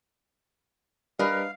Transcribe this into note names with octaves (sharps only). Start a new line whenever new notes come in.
G3 D4 A#4 B4 D#5 F5